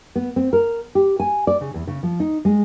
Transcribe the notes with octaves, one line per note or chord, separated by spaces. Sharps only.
B3
C4
A#4
G4
G#5
D5
C#3
E2
C#3
F3
D#4
G#3